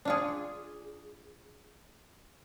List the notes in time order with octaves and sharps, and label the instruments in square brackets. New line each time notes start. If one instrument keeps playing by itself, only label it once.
[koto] D4 F4 G#4